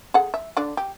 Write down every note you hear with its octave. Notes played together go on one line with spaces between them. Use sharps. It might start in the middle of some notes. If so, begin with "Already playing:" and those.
G#4 A4 F#5
E5
D3 D4 D5
G4